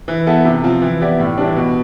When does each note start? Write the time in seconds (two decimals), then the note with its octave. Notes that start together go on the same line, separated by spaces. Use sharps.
0.08 E3
0.27 B3 E4 A4
0.45 C3
0.64 F3 C4 F4
0.82 E3
1.01 B3 E4 G4 D5
1.19 A2
1.38 E3 G3 D4
1.56 B2